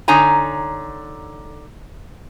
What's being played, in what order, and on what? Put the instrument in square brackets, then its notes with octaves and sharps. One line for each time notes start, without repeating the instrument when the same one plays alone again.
[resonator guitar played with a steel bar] D3 D#4 C#5 G#5 A#5